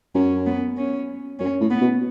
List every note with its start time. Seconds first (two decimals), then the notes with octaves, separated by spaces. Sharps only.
0.15 F#2 C#4
0.46 B3
0.78 C#4
1.40 F#2 C#4
1.61 A2
1.71 B3
1.81 B2